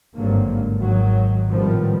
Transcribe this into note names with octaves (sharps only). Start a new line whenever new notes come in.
G#1 G2 D3 F#3 A#3
G#1 D#3 F#3
A2 C3 D#3 F3 G3 B3